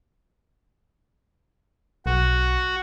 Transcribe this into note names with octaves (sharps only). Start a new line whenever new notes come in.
B1 F#4